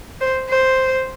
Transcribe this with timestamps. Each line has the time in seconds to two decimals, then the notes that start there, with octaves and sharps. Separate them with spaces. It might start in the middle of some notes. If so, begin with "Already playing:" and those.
0.21 C5
0.49 C5